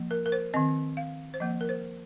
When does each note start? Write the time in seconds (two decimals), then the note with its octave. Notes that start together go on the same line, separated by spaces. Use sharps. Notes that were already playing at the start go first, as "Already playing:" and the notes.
Already playing: F3 A#3
0.11 A#4
0.26 A#4
0.32 C5
0.54 D#3 C4 D#5
0.97 F5
1.34 C5
1.40 F3 A#3 D#5
1.61 A#4
1.69 C5